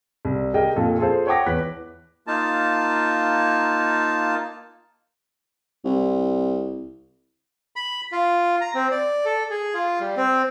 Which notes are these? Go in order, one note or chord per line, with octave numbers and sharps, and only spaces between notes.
C2
G4 G#4 A#4 D#5 G5
F2 A#2 A4 F5
F4 G#4 A4 C5
C#5 F#5 G5 A5 D6 A#6
E2 E3 B4 F#6 B6
A#3 D#4 F4 A5
C2
B5
F4
A#5
C4
D5
A4
G#4
F4
G3
C4